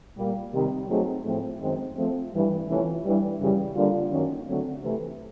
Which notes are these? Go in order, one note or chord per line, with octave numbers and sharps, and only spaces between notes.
A#2 G3 A#3
C3 D#3 G3
F#3 A3 C4 D#4 G#4
A2 F3 A3 C4
F#2 D#3 G#3 C4
F3 A3 C4
G2 E3 G3
C3 E3 A3 C#4 F4
G2 E3 G3
F#2 C#3 E3 G3
D3 G3 A#3 D4 F4
F#2 D#3 F#3 A#3 C#4
D3 F#3 A3 C4
C3 E3 A3